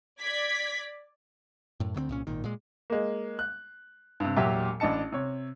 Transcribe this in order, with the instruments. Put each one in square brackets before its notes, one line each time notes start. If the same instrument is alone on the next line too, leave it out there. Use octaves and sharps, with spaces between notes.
[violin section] D5 G#6 B6
[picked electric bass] F#2 A2
D2 D3 A3 C4
C2 A#2 C#4
G#1 A#2 D#3
A#2 G#3
[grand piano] G#3 A#3
F#6
G2 C3
E1 A#2 F#3 G4 E5
A1 D4 D#5 A5 C#7
C3 C#5